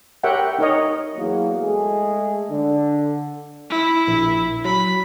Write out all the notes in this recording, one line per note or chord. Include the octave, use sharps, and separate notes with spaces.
G4 A#4 C#5 E5 F#5 G5
D#4 A#4 C#5 D#5
E2 F#3 A#3
G#3 A3 G#4
D3
E4
A#1
F#3 B5